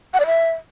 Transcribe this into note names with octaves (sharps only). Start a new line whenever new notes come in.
F#5
D5
E5